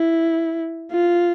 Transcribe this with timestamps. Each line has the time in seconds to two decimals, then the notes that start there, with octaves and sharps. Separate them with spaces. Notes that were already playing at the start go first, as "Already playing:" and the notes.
Already playing: E4
0.91 F4